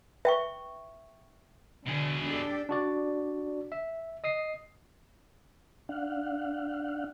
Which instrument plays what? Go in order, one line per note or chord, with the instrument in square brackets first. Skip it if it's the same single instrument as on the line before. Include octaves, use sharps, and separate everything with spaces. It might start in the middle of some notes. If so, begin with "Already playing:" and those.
[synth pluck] B4 [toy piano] E5 G5 C#6
[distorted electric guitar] B2 G#4 [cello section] D3
[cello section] D4 G4 A4
[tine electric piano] D4 F#4 D5
E5
D#5 D#6 C7
[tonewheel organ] D4 F5 F#5